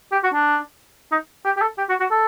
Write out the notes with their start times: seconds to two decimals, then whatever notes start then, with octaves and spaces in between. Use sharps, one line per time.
0.12 G4
0.23 F#4
0.34 D4
1.12 D#4
1.45 G4
1.57 G4
1.62 A4
1.78 G4
1.89 F#4
2.00 F#4
2.11 A4